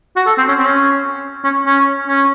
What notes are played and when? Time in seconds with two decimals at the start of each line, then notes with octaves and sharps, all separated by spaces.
0.17 F#4
0.26 A4
0.38 C4
0.48 C#4
0.59 C4
0.65 C#4
1.44 C#4
1.66 C#4
2.08 C#4